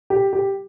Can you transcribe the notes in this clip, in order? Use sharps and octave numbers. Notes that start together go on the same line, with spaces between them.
G4
G4